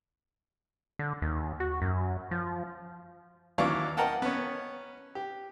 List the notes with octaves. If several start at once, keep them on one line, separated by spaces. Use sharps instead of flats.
D3
D#2
F#4
F#2
F3
D#2 E3 F#3 D5 F5 C#6
A#4 D#5 F#5 G5 A5
B3 C#4
G4